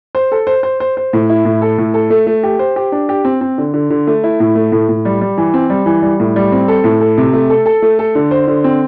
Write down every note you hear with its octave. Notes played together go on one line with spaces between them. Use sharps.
C5
A4
C5
C5
C5
C5
A2
E4
A2
A4
A2
A4
A3
A3
G4
C5
G4
D4
G4
C4
C4
D3
D3
D3
A3
E4
A2
A3
A2
A2
G3
G3
E3
C4
G3
E3
G3
A2
G3
C4
A4
A2
A4
C3
A3
A4
A4
A3
A4
D3
C5
D3
C4